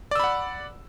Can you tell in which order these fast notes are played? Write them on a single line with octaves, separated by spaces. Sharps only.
D5 E6 B5 F#5